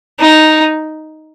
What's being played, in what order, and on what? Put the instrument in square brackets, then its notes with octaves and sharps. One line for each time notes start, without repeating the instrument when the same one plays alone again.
[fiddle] D#4